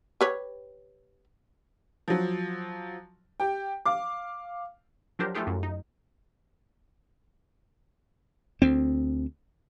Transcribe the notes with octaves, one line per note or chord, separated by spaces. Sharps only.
G4 B4 C#5
F3 F#3
G4 G5
F5 D6
F3 F#3 D4 G4 A#4 C5
A3 E4 F4 G4 G#4
F#2
D#4
D2 C4